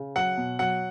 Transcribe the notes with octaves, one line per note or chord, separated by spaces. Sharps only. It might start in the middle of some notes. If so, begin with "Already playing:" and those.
Already playing: C#3
F#3 F#5
B2
F#3 F#5